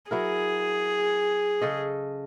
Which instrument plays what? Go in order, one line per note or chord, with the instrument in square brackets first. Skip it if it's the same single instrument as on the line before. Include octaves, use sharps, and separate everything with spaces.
[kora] F#3 E4 A#4 [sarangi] G#4
[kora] C#3 A4 D#5